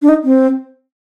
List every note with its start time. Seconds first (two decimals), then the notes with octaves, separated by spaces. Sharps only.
0.02 D4
0.09 D#4
0.24 C4